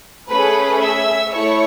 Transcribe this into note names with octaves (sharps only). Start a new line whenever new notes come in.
A3 C#4 G#4 B4 B5
E5 E6
A3 E4 A4 C#5 C#6